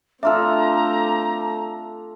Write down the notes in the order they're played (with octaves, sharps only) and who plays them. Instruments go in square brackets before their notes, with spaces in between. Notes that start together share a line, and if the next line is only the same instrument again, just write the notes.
[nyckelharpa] A3 C4 [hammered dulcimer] D4 F4 A4 [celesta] E5 [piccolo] A#5